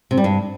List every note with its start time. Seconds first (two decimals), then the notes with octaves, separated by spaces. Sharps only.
0.11 C3
0.17 G3
0.24 G2